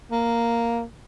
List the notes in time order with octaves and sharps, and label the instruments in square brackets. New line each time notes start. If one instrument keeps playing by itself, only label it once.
[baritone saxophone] A#3